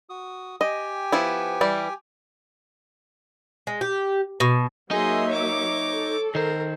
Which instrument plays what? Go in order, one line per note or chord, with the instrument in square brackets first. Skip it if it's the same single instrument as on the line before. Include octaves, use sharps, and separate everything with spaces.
[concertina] F#4 D#6
[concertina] G4 G5 G#5 [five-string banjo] D#5
[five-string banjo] F3 B3 E4
E3 G3
[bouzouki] G#3
G4
B2
[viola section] F#3 A#3 E5 [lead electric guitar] D#4 D#5 [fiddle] G#4 C6
[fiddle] C#5 D6
[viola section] A4
[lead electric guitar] D#3 C5 [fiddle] A#4